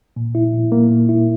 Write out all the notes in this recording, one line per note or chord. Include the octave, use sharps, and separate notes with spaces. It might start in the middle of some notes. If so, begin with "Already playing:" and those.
A#2
E4
A#2
A#3
A#2
E4